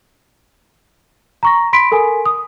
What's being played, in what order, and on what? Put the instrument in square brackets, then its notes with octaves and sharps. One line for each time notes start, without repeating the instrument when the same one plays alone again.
[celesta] A#5 C#6 A#6
B5 C6 B6 D7
A4 A#4 G#5
D#6